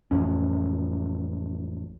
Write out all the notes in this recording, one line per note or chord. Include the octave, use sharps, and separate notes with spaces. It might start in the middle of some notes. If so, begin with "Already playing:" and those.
A1 F2 C#4